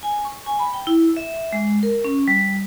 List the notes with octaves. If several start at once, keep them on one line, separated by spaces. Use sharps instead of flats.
G#5
C#6
G#5
B5
G5
E4
E5
G#3
A#4
C#4
G3